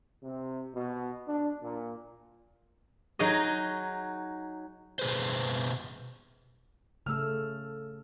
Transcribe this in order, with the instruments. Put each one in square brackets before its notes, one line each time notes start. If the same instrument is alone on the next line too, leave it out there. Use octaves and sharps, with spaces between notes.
[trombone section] C3
B2
D4
A#2
[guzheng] F#3 D#4 F#4 G#4 D#5
[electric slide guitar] B2 G#4 B4 C5
[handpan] C#3 A3 A4 [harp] E6 F6